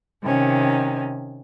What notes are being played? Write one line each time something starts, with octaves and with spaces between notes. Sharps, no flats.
C3 D#3 C#4